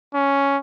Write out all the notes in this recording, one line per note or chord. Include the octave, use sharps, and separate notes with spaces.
C#4